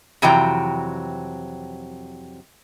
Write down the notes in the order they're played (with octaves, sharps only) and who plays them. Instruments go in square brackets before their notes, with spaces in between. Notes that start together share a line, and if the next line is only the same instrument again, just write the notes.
[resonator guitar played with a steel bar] F2 C3 E3 F#3 G5 A#5